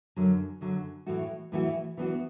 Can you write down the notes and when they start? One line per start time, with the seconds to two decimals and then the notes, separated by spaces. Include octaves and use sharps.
0.16 F#2 D3 F#3
0.61 F#2 D3 F#3
1.07 A2 E3 A3 F#4
1.52 A2 E3 A3 F#4
1.97 E3 B3 D4 F#4